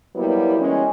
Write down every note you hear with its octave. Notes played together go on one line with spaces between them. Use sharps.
F#3 G3 A#3 B3 E4
E3 G#3 C#4